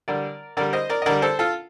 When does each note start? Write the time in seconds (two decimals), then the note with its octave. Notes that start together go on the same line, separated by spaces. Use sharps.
0.08 D3 G3 A#4 D5
0.57 D3 G3 A#4 D5
0.73 C5 D#5
0.90 A#4 D5
1.02 D#5
1.06 D3 G3 A#4 D5
1.22 A4 C5
1.39 F4 A4